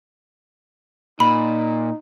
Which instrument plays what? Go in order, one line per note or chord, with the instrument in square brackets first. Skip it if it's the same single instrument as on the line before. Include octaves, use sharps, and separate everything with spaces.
[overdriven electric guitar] A#2 [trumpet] D#4 [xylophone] B5